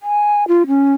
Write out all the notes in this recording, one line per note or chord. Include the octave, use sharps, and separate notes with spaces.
G#5
F4
C#4